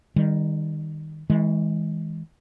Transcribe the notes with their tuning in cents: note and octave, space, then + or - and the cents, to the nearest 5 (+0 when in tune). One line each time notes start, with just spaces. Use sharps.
D#3 +0 G3 +30
E3 -35 G#3 +0